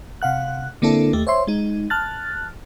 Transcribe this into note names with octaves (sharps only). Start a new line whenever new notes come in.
C3 F5 F#5 F#6
D3 A#3 C4 D4 E4 A4
D#2 A3 G4
C5 C#5 E5 C6
G#3 D#4
A5 F6 F#6 A6